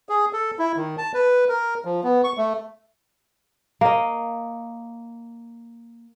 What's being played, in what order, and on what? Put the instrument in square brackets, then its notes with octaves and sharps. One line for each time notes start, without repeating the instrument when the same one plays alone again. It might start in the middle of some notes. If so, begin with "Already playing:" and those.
[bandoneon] G#4
A4
E4
D#3
A5
B4
A#4
F3
B3
C#6
A3
[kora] A#3 D#5